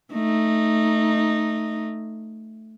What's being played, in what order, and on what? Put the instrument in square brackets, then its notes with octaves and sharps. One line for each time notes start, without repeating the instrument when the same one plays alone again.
[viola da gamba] A3 D#4